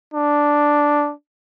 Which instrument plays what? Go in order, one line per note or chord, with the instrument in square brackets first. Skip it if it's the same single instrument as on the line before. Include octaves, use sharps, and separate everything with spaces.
[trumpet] D4